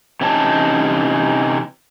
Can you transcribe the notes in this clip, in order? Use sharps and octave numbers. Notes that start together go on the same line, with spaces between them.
C3 E3 C#4 D#4 A5